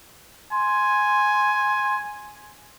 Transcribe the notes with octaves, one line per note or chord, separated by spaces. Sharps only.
G#5 C6